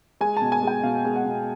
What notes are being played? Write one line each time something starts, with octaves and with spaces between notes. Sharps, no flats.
G#3 G#5
B2 A5
G#5
G#3 G5
B2 F5
G#3
F#5
B2